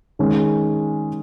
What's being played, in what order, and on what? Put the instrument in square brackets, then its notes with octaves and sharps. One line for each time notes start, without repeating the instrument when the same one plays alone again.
[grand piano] D#3 G#3 C#4 G#4